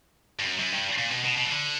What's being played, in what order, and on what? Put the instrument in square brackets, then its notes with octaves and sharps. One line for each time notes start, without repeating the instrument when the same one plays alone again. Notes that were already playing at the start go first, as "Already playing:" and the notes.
[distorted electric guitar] G2
F#2
F#2
G2
A#2
B2
B2
B2
E3
D3